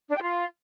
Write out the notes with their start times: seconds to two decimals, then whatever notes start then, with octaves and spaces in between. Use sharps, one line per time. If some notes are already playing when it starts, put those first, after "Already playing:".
0.10 D4
0.16 G5
0.22 F4